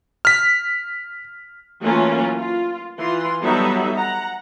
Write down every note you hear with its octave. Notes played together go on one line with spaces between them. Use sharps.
F6 B6
E3 F#3 A3 A#3 C#4 F4
F4
E3 F4 C6
F#3 G3 B3 D#4 A4 E5
F#5 A#5